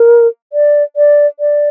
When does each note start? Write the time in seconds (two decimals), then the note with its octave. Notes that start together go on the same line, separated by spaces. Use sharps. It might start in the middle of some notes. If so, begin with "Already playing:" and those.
Already playing: A#4
0.53 D5
0.96 D5
1.40 D5